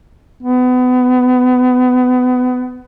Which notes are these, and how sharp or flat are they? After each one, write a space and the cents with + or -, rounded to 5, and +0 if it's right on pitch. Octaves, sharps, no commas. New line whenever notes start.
B3 +25